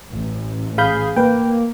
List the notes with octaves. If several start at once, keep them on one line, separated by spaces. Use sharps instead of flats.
A1
G#4 F5 B5 G6
A#3 B4 G5